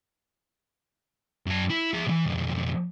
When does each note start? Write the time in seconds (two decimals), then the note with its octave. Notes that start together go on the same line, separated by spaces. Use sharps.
1.46 F#2 A5
1.70 E4
1.94 G#4 E5
2.07 B1 E3
2.26 B1 F2